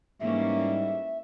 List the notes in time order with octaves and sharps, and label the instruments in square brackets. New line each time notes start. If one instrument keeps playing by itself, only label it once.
[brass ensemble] G#2 G3 [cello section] E3 A#3 C#4 [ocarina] E5